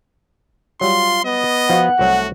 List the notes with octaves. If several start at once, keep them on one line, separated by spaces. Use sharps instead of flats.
F#3 G3 F4 C6
B3 D#5
F3 F4 F#4 F#5
C2 F#3 A3 F#4